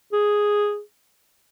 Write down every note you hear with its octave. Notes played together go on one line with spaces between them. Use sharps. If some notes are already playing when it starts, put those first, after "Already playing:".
G#4